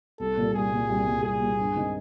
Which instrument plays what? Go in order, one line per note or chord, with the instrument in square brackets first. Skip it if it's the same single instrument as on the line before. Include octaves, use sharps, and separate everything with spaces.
[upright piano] C2 [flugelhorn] A4
[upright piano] A#2 G3
[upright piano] C2 [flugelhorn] G#4
[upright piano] A#2 G3
C2
A#2 G3
[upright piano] C2 [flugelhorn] G#4
[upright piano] A#2 G3
G2
D#3 G#3 C4 D#4